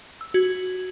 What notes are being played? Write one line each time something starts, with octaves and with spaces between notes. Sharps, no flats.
E6
F#4 G#6